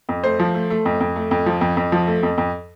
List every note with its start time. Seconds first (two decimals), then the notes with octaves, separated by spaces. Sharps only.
0.09 F2
0.24 A3 C5
0.39 F3
0.54 A3
0.70 A3
0.85 F2
1.00 F2
1.16 A3
1.31 F2
1.46 F3
1.61 F2
1.77 F2
1.92 F3
2.07 A3
2.23 F2
2.38 F2